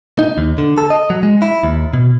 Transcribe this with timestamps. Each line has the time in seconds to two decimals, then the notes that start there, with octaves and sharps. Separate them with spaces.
0.19 D#4
0.38 D#2
0.58 D3
0.78 A4
0.90 D#5
1.10 F#3
1.23 G#3
1.42 E4
1.63 D#2
1.93 B2